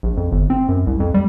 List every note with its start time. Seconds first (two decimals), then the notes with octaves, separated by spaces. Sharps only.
0.03 A#1
0.17 F2
0.32 G1
0.50 C4
0.69 F#2
0.87 C2
1.00 F2
1.14 G3